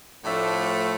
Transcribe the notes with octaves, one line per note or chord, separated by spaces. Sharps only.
A2 F3 A3 D4